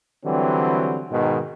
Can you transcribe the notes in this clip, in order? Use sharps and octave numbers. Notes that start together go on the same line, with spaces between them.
D3 E3 F#3 G3 C4
G#2 B2 D#3